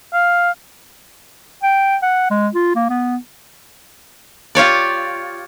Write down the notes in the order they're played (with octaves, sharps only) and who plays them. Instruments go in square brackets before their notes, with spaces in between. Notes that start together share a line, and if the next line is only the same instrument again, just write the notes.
[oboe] F5
[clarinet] G5
F#5
G#3
F4
A#3
B3
[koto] F4 G4 C#5 D5